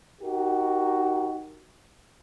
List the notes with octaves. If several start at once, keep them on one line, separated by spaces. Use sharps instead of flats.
D#4 F#4 G4 A#4